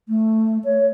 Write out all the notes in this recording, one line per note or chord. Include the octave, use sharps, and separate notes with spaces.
A3
C#5